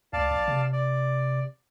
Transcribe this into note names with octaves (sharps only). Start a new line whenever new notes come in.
C#2 D5 F5 A5
B1
C3
D5